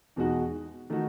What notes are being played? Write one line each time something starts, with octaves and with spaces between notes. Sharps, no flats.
E2 B2 G#3 D#4 F#4
D#3 A3 D#4 F#4